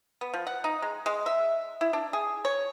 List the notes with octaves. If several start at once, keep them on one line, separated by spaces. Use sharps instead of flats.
B3
F3
F#5
D#4
G#3
G#3
E5
E4
D4
G#4
C#5